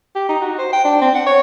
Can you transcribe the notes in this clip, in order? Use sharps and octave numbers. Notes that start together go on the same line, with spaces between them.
G4
D#4
F#4
C5
G5
D4
C4
F#5
C#5